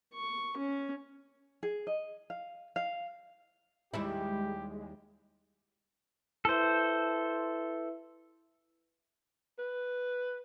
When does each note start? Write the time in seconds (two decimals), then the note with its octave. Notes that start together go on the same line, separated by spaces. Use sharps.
0.14 C#6
0.57 C#4
1.63 G#4
1.87 D#5
2.30 F5
2.76 F5
3.93 D#2 G3 G#3 E4 G4
6.45 E4 A4 B4 C5 E5
9.58 B4